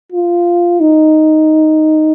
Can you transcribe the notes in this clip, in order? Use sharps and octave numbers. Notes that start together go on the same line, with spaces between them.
F4
D#4